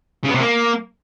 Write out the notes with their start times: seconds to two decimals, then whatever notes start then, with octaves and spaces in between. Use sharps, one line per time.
0.24 C#3
0.29 B3
0.35 C3
0.40 A#3